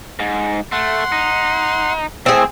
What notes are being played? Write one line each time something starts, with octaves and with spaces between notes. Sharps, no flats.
G#2
A3 F#5 C6
D#4
A2 C4 G#4